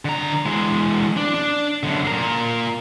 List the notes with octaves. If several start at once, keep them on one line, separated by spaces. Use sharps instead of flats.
D3 A#5
E3 G#3
D4
D4
F#2 D3
A#2 A#4